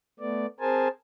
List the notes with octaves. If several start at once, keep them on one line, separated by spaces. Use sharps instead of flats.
A3 B3 D5
C4 G#4 A#4 C5 G#5 A5